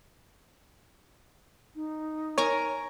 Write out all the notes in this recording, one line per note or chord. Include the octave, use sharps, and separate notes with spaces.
D#4
A#4 C#5 G#5 A#5